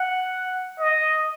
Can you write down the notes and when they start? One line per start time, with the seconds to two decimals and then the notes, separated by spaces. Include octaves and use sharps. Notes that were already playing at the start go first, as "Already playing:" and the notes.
Already playing: F#5
0.80 D#5